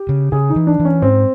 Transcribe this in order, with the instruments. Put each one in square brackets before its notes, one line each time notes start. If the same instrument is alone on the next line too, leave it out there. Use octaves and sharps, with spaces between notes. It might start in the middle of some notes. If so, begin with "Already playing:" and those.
Already playing: [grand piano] G4
[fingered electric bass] C#3
[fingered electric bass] C#3 [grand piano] G#4
[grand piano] D#4
[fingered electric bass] E3
[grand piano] D4
[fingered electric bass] E3
[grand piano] C#4
[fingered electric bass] G#2 [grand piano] C4